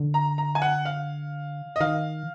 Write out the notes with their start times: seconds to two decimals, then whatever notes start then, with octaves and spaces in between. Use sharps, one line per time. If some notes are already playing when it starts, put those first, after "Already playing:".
Already playing: D3
0.14 A#5
0.38 A#5
0.55 G#5
0.62 F#5
0.85 F5
1.76 D#5
1.81 D#3 F5